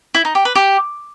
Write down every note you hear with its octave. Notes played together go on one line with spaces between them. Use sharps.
E4
D#4
G4
B4
G4